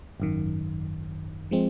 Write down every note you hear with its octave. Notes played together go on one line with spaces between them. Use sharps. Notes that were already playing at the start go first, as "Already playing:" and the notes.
G#1 F#2 D#3
F3 G#3 C4